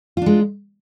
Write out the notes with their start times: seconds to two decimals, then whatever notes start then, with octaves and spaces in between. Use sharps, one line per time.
0.17 F4
0.22 D4
0.26 G#3